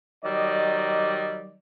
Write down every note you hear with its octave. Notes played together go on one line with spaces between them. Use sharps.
D#3 F#3 G3 D5 D#5